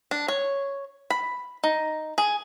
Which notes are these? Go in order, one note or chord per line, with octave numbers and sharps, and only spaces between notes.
D4
C#5
B5
D#4
G#4